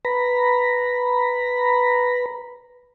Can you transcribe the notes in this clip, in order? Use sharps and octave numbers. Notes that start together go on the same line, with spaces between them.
B4 A#5 B5